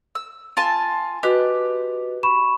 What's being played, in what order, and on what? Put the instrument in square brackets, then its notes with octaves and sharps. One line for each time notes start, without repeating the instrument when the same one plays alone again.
[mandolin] E6
F4 G#5 A5
[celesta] F#4 B4 D#5 [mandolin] G4 F#6
[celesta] B5 C#6 E7